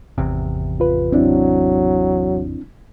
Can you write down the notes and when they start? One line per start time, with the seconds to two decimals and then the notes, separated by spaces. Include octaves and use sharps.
0.18 G#1 E2 C3
0.80 F4 B4
1.12 F#3 C4 D4 E4